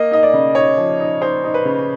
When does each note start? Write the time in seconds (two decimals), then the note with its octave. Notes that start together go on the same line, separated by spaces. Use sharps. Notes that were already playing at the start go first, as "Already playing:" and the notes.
Already playing: A#3 D#5
0.11 D#4 D#5
0.23 D5
0.34 C#3
0.55 D#4 C#5
0.77 F3
1.00 D#4
1.21 D#4 C5
1.44 D#4
1.54 B4
1.65 C#3